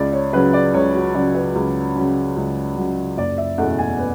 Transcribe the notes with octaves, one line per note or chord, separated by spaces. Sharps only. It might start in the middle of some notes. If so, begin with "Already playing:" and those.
Already playing: C#2 D5
C#5
C#3 F#3 C#4 B4
D5
C#2 C#5
F#4
C#3 F#3 C#4 D5
B4
C#2
C#3 F#3 C#4
C#2
C#3 F#3 C#4
F#1 D5
E5
E2 B2 A3 C#4 F#5
G#5
B4